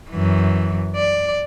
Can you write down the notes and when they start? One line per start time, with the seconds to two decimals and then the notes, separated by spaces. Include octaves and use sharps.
0.11 F#2 E3
0.96 D5